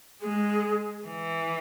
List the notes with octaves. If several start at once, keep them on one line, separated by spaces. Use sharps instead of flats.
G#3 G#4
E3